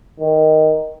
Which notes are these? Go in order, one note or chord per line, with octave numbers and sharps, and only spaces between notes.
D#3